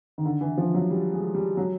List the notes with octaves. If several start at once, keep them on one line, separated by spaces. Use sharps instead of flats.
D#3
D3
E3
F3
F#3
G3
G#3
G3
F#3